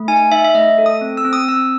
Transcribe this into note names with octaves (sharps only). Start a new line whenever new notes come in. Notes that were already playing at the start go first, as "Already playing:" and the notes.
Already playing: A3
D#4 G#5
D#4 E5
E5
A3 D#5
A4
D#6
C4
E6
C4
D#6
C4 E6